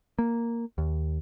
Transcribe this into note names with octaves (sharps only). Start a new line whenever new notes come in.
A#3
D#2